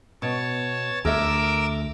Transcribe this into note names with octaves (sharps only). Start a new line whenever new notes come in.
B2 C#5 A5
D2 A4 A#4 E5 D6 E6